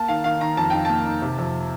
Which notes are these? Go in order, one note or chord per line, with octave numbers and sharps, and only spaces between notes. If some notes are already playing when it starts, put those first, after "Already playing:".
Already playing: A#3 A5
D#3 F5
D#3 F5
D#3 A#5
F2 A5
D#4 G5
A#3 A5
D#4
C3
F2